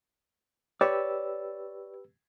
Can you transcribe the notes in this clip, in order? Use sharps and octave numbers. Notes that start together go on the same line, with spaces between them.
G4 B4 C#5 D5 E6